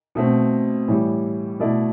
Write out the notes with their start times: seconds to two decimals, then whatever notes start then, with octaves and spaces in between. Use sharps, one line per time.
0.15 B2 A3 C4
0.88 A2 E3 G3
1.60 B2 A3 E4 A4 D5